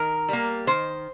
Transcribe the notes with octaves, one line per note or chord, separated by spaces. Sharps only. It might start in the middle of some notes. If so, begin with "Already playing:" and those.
Already playing: D#3 A#4
G3 A#3
D#3 C5